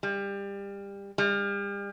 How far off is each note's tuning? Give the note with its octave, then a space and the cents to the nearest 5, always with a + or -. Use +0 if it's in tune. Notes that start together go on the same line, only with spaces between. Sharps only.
G3 +25
G3 +40